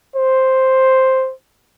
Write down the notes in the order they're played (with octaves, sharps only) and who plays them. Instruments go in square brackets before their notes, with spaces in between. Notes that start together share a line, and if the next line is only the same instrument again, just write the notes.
[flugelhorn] C5